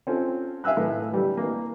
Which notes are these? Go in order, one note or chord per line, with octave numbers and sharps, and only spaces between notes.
C4 C#4 F4 A4
E5 F5 G#5 E6 F#6
A2 E3 A4
D3 E3 G3
E3 A#3